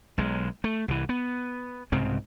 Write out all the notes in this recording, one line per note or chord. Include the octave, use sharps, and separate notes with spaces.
B1 G#3
A3
C2 E3
B3
C2 G#2 C#3 C4